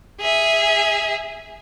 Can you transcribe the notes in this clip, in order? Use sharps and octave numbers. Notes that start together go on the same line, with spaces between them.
G#4 E5